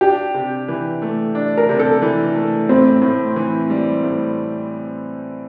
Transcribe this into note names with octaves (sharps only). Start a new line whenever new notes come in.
D4 G4
C3
E3
A3
D4
A#4
C3
A4
E3
A3
A2 C4
A2
E3
G3
A2